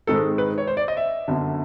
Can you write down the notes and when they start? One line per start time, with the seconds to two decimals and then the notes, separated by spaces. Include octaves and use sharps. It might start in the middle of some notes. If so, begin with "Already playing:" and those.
0.07 G#2 D#3 G#3 C4 A4
0.38 B4
0.58 C#5
0.67 C5
0.77 D5
0.88 D#5
0.97 E5
1.28 G1 F#2 D3